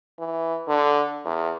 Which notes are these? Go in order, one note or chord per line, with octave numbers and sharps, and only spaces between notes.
E3
D3
E2